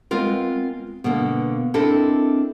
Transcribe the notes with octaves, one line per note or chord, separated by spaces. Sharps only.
G#3 B3 C4 F4 A#4
B2 D3 A#3 B3
C4 D4 E4 A4 A#4 D#5